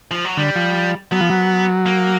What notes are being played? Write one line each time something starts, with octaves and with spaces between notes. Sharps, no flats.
F3
F#3
D3 G3
F3
F#3 B3
F3
F#3
A#3